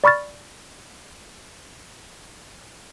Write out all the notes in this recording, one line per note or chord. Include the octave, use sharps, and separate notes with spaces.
D5 B5 C#6 F6 A6